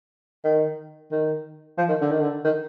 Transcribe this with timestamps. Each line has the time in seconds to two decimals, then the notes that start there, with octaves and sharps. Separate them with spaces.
0.44 D#3
1.12 D#3
1.78 F3
1.89 D#3
2.01 D3
2.11 D#3
2.21 D3
2.45 D#3